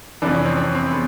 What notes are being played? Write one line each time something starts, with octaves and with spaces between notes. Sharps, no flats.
F2 C3 E3 D4
C#4
C4
C#4
C4
B3